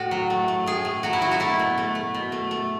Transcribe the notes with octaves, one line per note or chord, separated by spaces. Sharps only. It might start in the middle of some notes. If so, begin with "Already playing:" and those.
Already playing: A2 F#4
F#3
A3
A3
A2 G#4
A3
F#3 F#4
E4
F#3 F#4
F#4
A3 E4
B2
A3
A3
B2
A3
A3